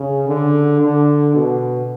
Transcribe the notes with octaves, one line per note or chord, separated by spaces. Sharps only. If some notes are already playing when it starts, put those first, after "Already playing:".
Already playing: C#3
D3
D3
B2